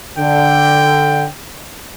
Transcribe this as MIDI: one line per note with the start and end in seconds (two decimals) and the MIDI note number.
0.18 1.25 50
0.18 1.28 79